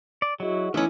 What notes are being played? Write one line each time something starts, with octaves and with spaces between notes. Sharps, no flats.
D5
F#3 E4 F#4 G#4 D#5
E3 A3 B3 C#4 D#4 E6 F6